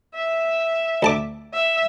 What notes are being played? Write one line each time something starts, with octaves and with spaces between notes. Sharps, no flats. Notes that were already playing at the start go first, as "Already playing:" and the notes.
E5
D2 A5 D6
E5